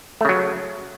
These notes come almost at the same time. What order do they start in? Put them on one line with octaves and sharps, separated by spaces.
A3 C#3 F#3